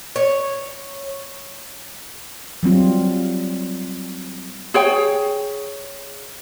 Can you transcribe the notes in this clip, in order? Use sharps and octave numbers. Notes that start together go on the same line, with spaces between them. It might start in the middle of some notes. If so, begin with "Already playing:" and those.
C#5
F#3 G3 C4 F4
G#4 C#5 G5